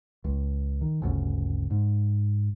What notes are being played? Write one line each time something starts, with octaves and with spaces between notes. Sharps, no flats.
C#2
D#3
G1 D2 C#3
G#2